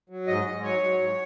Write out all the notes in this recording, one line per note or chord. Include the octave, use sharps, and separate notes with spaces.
F#3
G#2 D#5
G#2
F#3 C#5
F#3
G#2